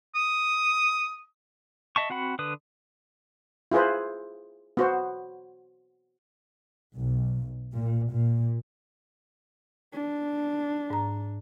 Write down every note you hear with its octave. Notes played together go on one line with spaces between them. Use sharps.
D#6
D#5 E5 A5 C#6
C4 F#4 F#5 B5
D3 B4 D#6
E4 F4 G#4 B4 C5
B3 F#4 C5
B1
A#2
A#2
D4
G#2 A#5